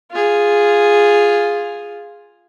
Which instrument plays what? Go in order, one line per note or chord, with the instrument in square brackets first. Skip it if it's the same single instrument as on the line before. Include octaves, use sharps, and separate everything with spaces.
[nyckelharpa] F4 G#4